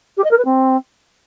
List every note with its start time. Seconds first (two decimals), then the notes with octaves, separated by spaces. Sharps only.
0.17 G4
0.24 D#5
0.31 A#4
0.38 B4
0.45 C4